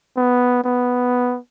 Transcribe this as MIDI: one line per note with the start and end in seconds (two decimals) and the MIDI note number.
0.16 0.63 59
0.64 1.38 59